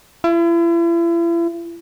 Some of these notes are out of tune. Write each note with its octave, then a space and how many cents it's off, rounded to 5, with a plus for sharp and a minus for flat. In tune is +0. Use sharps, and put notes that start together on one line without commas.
E4 +40